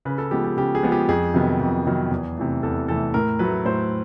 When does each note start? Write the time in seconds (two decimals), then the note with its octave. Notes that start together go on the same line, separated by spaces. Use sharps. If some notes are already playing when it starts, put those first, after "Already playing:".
0.05 C#3 B4
0.18 A4
0.31 F3 G#3 B3 G4
0.44 G4
0.57 C#3 G4
0.75 G#4
0.83 F3 G#3 B3
0.92 G4
1.08 F2 G#4
1.34 C3 D#3 F#3 B3
1.61 F2
1.86 C3 D#3 F#3 B3
2.11 E2
2.38 C3 E3 A3
2.63 E2 A4
2.88 C3 E3 A3 A4
3.14 A2 A#4
3.39 F#3 A3 B4
3.65 A2 C5